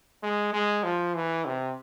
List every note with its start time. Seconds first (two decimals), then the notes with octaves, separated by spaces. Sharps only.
0.23 G#3
0.53 G#3
0.84 F3
1.14 E3
1.45 C3